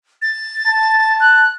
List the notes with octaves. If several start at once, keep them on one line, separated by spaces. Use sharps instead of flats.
A6
A5
F#6